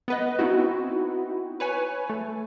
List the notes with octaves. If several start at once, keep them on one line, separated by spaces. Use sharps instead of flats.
B3 B4 D#5
B3 C4 D#4 E4 F#4
B4 C#5 G#5
A3